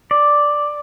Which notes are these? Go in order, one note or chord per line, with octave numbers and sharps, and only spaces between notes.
D5